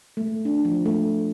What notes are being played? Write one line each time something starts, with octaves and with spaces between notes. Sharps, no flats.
A3
D4
F3
A3